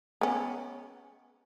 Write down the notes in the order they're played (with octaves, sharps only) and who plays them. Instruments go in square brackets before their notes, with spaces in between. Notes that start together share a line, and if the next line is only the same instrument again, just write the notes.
[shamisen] B3 C#4